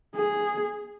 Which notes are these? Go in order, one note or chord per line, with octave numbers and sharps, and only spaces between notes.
G#4